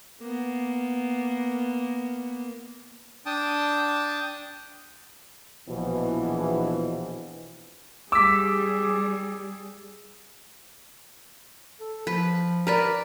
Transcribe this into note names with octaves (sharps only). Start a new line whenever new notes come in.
A#3 B3
D4 G5 A5 D#6
A#1 B2 E3 F3
G3 G#4 D6 E6 B6
A4
F3 B4
A#4 B4 D5